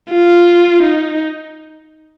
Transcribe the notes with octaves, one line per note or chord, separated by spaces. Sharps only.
F4
D#4